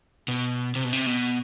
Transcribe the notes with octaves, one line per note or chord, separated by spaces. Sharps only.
B2
C3
B2
C3
B2